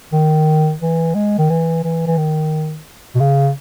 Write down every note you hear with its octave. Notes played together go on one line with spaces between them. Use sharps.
D#3
E3
G#3
D#3
E3
E3
E3
D#3
B2
C#3